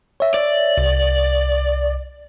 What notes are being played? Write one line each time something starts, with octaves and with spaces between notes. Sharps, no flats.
C#5 E5
D5
C2